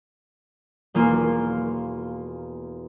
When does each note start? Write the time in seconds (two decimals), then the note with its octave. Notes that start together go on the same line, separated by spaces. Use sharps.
0.95 E1 A#3 F4